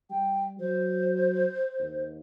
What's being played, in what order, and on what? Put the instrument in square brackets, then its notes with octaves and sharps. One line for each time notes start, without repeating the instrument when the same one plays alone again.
[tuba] G3 [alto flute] G5
[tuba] F#3 [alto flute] C5
[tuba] D#2